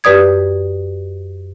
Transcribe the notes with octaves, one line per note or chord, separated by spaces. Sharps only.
F#2 G4 B4 D5 D#6 G#6